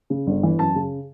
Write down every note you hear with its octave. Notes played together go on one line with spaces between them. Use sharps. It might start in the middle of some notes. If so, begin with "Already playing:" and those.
C#3
G1
E3
F#2 A5
C#3